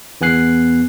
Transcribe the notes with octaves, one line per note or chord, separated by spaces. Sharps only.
E2 B3 G#5 F#6 C7